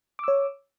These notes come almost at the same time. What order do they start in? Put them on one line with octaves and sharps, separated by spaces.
D6 E6 C#5